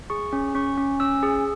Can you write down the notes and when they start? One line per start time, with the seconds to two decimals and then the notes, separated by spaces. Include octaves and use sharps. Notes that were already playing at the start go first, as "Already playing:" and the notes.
0.10 G#4 C#6
0.33 C#4
0.55 C#4 C#6
0.78 C#4
1.00 C#4 E6
1.23 G#4